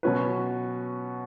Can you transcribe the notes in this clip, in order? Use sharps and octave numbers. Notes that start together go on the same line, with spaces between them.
B2 F#3 C#4 F#4 B4